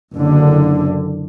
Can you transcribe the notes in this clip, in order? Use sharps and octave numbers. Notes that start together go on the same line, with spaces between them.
F#1 D3